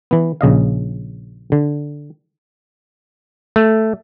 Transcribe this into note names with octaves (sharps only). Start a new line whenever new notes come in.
E3 B3
A#1 C#3 D#5 F5
D3
A3